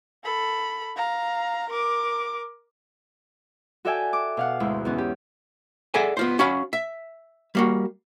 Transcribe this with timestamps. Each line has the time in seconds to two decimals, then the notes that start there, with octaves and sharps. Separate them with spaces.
0.24 A4 B5
0.96 F5 A#5
1.69 A#4 D6
3.85 F#4 A4 D5 E5 G5 G#5
4.13 D6
4.37 B2 F5 F#5
4.60 D2 G#2 E4
4.85 E2 B3 C#4
4.98 G4
5.94 G#4 A4 D5 E5 F#5 G#5
6.17 B3 F4 C5
6.39 C#4 F#4 F5 B5
6.73 E5
7.55 G3 A#3 F#4